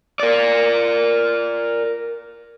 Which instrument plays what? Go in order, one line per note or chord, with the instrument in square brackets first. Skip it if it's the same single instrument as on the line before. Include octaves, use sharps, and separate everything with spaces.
[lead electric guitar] A#4 D5